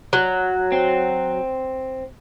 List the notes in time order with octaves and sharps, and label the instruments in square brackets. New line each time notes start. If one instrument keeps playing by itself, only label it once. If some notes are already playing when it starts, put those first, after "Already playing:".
[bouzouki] F#3
[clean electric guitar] C4